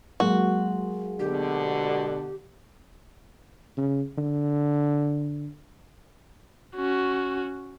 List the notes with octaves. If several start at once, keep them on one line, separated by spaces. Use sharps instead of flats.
F#3 G#3 A#3 F#4
B2 D3 G4
C#3
D3
C#4 F#4